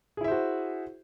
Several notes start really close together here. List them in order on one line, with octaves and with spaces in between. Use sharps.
G#4 E4 E5 C5 F#4